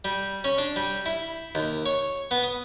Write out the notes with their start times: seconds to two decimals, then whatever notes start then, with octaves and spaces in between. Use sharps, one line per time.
0.05 G3
0.44 C#4
0.58 D4
0.76 G3
1.06 E4
1.55 D#2
1.86 C#5
2.31 B3
2.43 D#6